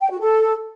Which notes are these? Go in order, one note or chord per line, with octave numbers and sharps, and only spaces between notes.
G5
F#4
A4